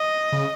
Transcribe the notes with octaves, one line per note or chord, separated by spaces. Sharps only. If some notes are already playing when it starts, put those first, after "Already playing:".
Already playing: D#5
C#3